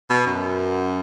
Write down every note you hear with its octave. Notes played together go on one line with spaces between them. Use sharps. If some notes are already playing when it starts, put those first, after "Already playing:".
B2
F#2